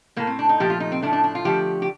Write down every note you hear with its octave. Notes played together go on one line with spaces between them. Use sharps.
A2 A3 A#3
C4
D4
D#4
A#2 F3 A3 G4
F4
D#4
C4
A2 F3 A3 D4
D4
D4
F4
D3 F3 A3 G4
G4